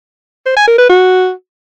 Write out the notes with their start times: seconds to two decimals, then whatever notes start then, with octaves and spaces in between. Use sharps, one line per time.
0.46 C5
0.57 G#5
0.68 A#4
0.79 B4
0.89 F#4